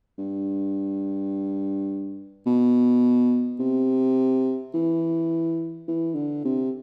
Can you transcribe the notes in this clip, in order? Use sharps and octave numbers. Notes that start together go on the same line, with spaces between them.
G2
B2
C3
E3
E3
D3
C3